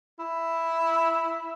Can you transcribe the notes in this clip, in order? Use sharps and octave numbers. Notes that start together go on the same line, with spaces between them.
E4